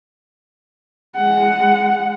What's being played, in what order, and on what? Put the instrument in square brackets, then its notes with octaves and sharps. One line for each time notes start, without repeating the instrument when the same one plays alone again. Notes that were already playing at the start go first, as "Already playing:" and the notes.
[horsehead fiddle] G#3 F#5